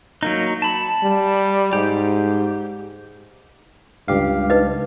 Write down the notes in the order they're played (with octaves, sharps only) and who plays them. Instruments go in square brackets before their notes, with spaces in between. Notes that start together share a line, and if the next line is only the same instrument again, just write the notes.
[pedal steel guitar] F#3 A#3 D#4
A5 B5
[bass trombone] G3
[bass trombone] G#2 [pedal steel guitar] G4
[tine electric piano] C#2 G4 F5 [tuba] G2
[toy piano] D#4 B4 D#5